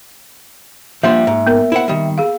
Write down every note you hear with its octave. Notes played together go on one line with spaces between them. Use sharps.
F3 G3 A#3 D4 E5 C6
G#2
B3 A#4
E4 C5 F#5
D#3 G3
G#4 F5